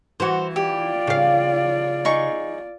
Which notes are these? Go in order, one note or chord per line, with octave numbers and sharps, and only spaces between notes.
E3 F#4 C5
F4 G4 D5
C#3 F5
D#4 G#4 C#6